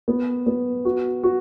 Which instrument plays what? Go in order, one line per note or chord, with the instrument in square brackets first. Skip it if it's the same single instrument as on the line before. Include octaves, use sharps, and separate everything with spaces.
[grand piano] B3
B3
F#4
F#4